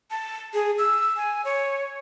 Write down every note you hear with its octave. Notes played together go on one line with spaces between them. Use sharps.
A5
G#4
E6
G#5
C#5